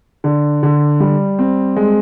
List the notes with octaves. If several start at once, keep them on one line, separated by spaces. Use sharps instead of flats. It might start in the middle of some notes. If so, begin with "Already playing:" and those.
D3
D3
G3
C4
G#3